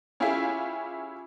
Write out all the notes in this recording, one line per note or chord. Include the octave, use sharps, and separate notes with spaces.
C#4 E4 F4 G4 G#4 E5